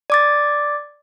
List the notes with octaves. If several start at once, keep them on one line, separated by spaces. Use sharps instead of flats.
D5 D6 A6